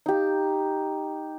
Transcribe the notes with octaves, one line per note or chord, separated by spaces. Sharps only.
D#4 G4